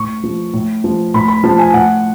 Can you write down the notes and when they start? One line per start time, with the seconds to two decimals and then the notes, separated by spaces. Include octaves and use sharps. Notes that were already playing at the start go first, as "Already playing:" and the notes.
Already playing: A2 C#6
0.23 F3
0.53 A2
0.84 F3
1.14 A2 B5
1.28 B5
1.44 F3 A5
1.59 G#5
1.73 A2 F#5